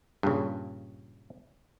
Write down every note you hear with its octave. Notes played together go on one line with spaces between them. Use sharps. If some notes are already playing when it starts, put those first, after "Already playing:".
G2 A#2 C#3